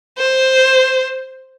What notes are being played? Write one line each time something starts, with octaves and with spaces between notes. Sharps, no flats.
C5